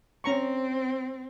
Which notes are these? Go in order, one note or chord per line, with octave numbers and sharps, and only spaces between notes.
C4 C#4 A#5 C#6